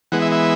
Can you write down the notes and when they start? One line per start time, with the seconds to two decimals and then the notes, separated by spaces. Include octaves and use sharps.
0.12 E3 G#3 B3 F#5
0.22 E5
0.32 E5